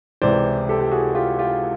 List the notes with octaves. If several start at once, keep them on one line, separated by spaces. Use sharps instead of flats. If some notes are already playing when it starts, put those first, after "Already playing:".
C#2 C3 E3 C5 D5
G4 A4
G4
F#4 G#4
F4 G4
F4 G4